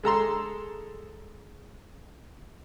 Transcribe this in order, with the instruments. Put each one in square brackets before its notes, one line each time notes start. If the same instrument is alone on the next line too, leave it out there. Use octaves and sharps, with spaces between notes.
[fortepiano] G#3 A4 A#5 C6